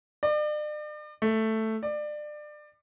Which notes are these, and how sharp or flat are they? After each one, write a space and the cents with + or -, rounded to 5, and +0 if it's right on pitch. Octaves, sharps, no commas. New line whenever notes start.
D5 +40
A3 +5
D5 +25